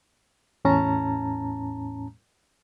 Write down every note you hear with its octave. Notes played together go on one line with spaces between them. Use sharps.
E2 A2 C#4 A5 A#5